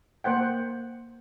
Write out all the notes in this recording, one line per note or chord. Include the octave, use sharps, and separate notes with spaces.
A#3 C5 F#5 G5